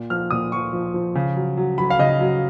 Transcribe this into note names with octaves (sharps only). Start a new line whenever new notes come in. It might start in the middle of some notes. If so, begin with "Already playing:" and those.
Already playing: A#2
F3 F6
A#2 D#6
F3 C#6
F3
F3
C#3
F#3
F#3
F#3 B5
F5
C#3 D#5
F#3